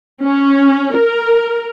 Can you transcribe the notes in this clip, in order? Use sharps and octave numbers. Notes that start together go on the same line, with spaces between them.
C#4
A#4